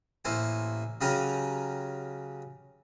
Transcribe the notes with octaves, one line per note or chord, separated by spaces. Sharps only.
A1 A3 A#3 C5 G#5
C#3 F#3 C#4 G4 A#4 A#5